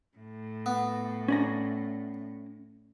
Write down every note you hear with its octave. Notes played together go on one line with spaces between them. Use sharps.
A2
B3
C#4 D5 A#5